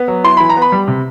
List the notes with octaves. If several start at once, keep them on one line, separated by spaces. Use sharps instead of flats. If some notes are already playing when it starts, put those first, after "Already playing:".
Already playing: B3
F#3
E4 C6
E3 B5
A#5
B3
B5
G3
C3